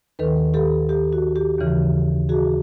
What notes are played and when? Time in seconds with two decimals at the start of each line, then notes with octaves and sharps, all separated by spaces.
0.19 D#2 D#3 A4 B4
0.54 G4 A4
0.89 G4
1.13 F#4
1.36 G4
1.59 D#2 C#3 E3
2.29 F#4 G#4